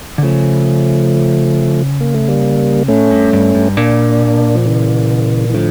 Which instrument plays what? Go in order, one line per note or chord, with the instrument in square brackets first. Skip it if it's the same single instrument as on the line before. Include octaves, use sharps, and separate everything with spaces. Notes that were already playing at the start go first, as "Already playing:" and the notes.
[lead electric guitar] D3
[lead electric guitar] C#3 [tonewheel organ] F3 A3
[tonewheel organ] A#3
A3
G3 A#3
[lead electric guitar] A2 [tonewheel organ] A3 C#4
[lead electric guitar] G2
G2
G2
[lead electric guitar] A#2 [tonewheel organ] A#3 D4
[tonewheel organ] F3
C#3 E3
E3
[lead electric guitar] A2 [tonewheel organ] D3 F3